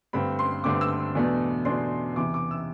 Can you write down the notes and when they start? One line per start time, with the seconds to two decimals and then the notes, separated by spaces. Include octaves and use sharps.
0.13 G2 D3 A3 C4 B5
0.39 C6
0.64 G2 D3 A3 C4 D6
0.81 E6
1.15 E2 B2 A3 D4
1.65 E2 B2 A3 D4 C6
2.16 E2 C3 E3 D6
2.34 D6
2.51 E6